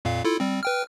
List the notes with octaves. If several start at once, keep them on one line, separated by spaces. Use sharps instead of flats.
F2 A#2 F5
E4 F4 A4
G3 C4
B4 G5 F6